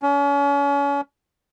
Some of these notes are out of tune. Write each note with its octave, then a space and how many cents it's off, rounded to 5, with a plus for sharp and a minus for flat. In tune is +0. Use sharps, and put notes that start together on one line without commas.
C#4 +35